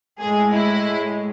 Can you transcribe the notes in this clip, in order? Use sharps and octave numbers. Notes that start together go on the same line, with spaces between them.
A2 G#3 G#4
E4